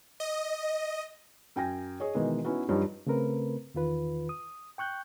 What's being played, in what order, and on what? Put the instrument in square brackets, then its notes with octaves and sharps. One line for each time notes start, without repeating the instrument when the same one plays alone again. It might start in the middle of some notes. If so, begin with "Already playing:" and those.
[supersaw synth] D#5
[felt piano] F#2 G5 G#5 A#6
G#4 C#5 D#5
B2 D#3 E3 G#3
B3 C#4 D#4 E4 F#4 B4
G2 F3 G3 D#4 C#5
[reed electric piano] C#3 A3 C4 A#4 B4
E2 D#3 F4 B4
D#6
G5 C#6 F#6 G6